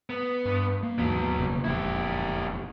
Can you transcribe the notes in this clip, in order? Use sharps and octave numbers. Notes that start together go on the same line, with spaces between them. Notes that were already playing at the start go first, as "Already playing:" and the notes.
B3
G2
A#3
D#2 G#2 B2 E3 F#3
F1 C#3 A#3
E1 F2 A#2 E4 G4